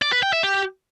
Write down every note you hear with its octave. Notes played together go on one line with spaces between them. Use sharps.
D5
B4
G5
E5
G4